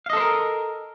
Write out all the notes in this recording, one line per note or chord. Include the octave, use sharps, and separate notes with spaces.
A4 A#4 C5 D#5 F5